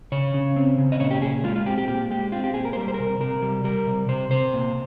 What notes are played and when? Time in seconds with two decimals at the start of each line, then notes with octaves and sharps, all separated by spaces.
0.12 C#3 C#5
0.34 C#3
0.56 C4
0.78 C#3
0.92 D#5
1.00 A#2 C#5
1.11 G4
1.22 A#2 G#4
1.44 G#3 F4
1.56 F4
1.66 C4 G4
1.78 G4
1.88 A#2 G4
2.11 G#3 G4
2.32 C4 F4
2.44 G4
2.54 A#2 G#4
2.65 A#4
2.73 C5
2.77 G3 A#4
2.88 C5
2.94 A#4
2.99 C3
3.20 C3 A#4
3.42 G3
3.64 G3 A#4
3.86 C3
4.08 C3 C5
4.31 C3 C5
4.53 A#2